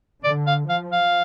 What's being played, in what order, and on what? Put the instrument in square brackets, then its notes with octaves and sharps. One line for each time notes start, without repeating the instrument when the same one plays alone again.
[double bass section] D3 [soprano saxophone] D5
[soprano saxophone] F5
[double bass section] F3 [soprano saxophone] F5
[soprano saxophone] F5